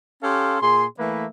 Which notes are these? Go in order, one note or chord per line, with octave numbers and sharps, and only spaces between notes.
C#4 G4 A4 F5 C6
A#2 G#4 C6
E3 A3 A#3 B4 E5